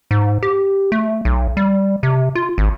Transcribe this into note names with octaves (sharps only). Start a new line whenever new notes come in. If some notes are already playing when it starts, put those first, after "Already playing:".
G#2
G4
A3
B1
G3
C3
F4
G#1